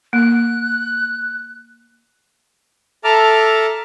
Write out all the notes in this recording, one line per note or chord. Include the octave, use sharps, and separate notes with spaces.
A#3 F#6
A4 E5 A5 A#5 D6 F6